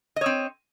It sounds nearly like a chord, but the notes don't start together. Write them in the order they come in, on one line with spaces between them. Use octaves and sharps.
D#5 C#5 C4